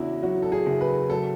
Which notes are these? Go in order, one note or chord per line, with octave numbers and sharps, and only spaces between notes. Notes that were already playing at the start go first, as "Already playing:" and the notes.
Already playing: E2 C#3 D4 E4 F#4
F#3 F#4
A4
G#4
F#1
B4
F#3 A4